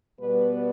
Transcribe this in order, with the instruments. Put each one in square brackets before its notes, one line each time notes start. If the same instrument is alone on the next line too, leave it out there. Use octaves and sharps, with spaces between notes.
[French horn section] B2 G3 B3 B4